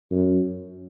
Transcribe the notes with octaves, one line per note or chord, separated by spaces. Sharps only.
F#2